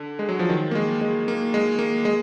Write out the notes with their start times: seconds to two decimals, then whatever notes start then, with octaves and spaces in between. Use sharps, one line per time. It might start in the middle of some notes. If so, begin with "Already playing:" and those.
Already playing: D3
0.19 G#3
0.29 F#3
0.39 F3
0.49 D#3
0.71 A#3
0.75 G#3
1.01 G#3
1.28 A#3
1.54 G#3
1.79 A#3
2.05 G#3